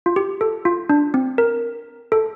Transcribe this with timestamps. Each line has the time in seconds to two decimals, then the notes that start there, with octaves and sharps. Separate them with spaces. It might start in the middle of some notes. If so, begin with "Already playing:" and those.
0.06 F4
0.16 G4
0.41 A4
0.65 F4
0.89 D4
1.14 C4
1.38 A#4
2.12 A4